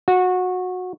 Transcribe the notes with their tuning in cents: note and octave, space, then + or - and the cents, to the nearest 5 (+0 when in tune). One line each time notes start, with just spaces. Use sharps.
F#4 -20